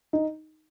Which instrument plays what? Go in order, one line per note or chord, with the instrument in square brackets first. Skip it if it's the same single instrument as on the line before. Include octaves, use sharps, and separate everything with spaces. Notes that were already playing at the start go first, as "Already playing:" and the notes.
[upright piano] D#4